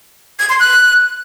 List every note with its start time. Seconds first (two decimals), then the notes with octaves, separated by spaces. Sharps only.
0.39 G#6
0.50 C6
0.60 F#6